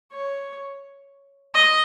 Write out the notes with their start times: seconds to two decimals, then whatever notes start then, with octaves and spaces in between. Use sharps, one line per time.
0.12 C#5
1.54 D#5